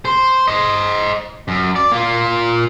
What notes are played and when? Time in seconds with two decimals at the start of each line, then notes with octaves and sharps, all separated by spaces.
0.05 C5
0.48 C5 D#5
1.48 F#2
1.76 D5
1.92 A#3 F4